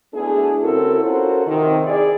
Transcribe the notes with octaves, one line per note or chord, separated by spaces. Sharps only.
B2 A3 B3 D4 E4 G#4
C#3 C4 E4 F#4 A4 A#4
C#4 F4 F#4 A4 A#4 C5
C3 D#3
D#4 E4 G#4 D5